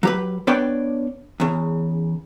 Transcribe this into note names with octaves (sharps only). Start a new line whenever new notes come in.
F#3 G4 B4
B3 D4 B4 C#5 D5 G5
E2 C#3